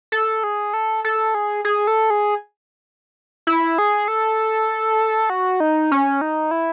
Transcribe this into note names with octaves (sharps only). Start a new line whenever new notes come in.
A4
G#4
A4
A4
G#4
G#4
A4
G#4
E4
G#4
A4
F#4
D#4
C#4
D#4
E4